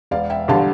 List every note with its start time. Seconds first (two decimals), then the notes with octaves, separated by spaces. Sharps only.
0.11 E1 D5 F5
0.30 E5 G5
0.48 E2 D3 G3 F5 A5